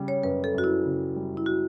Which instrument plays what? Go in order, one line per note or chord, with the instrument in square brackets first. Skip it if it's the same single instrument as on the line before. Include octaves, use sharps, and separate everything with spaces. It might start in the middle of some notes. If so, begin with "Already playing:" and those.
Already playing: [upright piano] C#3 G3
[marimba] C#5
[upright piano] F#2 [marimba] B4
[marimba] A4
[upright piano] F#2 [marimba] F#4
[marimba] E4
[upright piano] C#3
G3
[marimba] E4
F#4